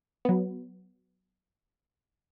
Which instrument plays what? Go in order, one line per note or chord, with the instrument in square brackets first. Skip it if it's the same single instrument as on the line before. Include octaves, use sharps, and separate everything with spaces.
[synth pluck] F#3 B3